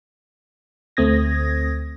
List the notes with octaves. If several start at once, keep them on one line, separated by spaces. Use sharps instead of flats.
D2 A3 C4 D#6 G#6 A#6